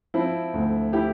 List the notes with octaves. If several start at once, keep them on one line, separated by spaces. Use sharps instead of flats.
F3 C4 E4
D2
E4 G4